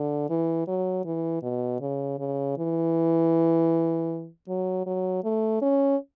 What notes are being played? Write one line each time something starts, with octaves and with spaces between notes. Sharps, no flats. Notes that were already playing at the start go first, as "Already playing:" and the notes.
Already playing: D3
E3
F#3
E3
B2
C#3
C#3
E3
F#3
F#3
A3
C#4